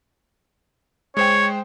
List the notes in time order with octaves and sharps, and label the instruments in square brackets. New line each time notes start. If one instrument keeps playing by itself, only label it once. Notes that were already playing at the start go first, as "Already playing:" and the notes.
[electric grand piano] G#3 C5 G5 [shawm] C#5